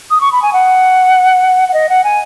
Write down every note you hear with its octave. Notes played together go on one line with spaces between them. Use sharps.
D#6
C#6
B5
G#5
F#5
F#5
D#5
F#5
G#5